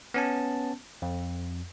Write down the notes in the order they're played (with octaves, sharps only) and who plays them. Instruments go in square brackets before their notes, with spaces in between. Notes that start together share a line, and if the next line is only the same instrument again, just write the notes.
[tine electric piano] B3 C#4 A5
F2